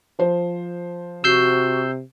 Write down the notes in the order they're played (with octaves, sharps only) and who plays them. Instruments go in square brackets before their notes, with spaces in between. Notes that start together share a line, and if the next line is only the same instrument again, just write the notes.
[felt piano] F3 C5
[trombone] C3 [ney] F#4 [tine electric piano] E6 G6 C7